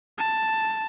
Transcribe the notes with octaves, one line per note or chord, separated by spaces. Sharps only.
A5